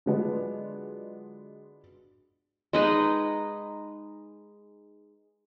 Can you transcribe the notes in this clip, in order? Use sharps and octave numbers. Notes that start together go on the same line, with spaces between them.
D3 F#3 G#3 B3 D4 F4
G#3 D#4 B4